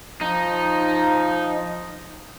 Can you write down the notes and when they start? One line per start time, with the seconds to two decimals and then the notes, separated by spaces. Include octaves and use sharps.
0.21 F3 D#4